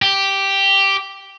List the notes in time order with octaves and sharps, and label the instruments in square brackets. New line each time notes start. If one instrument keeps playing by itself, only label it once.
[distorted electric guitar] G4